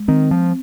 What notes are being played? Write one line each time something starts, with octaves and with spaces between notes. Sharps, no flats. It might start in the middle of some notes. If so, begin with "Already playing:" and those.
Already playing: G#3
D#3 C4
F3